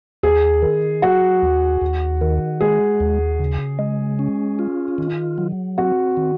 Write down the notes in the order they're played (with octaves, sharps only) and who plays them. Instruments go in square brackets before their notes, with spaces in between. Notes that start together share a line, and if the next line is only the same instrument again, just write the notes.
[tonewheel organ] D#2 [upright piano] G#4
[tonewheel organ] D#3
[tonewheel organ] F#3 [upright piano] F#4
[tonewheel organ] D#2
D#2
D#3
[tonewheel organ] G#3 [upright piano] G#4
[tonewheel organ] D#2
C#3
G#3
C#4
F4
D#3
F#3
[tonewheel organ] C4 [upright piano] F#4
[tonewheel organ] D#3